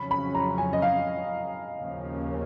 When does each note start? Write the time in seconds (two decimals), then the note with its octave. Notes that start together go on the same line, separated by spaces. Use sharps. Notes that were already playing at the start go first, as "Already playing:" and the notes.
Already playing: F2 C#3 F#3 C#4 B5
0.11 B5
0.35 A#5
0.58 G#5
0.73 D#5
0.82 F5
1.77 D#2 C#3 F3 A#3 C#4